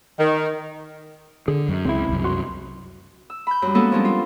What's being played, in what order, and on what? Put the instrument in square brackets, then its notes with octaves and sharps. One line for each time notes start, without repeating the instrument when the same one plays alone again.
[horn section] D#3
[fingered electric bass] D3 [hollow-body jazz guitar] G#4
[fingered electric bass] F#2
[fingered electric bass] C#2 [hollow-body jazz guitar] C4 E4
[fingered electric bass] C2 F#2
[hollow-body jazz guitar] F#4 C6
[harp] E6
B5 G6
F#2 G3
G#3 A#3 B3 C#4 F#4 A4
F3 G3 C#4 D4
F4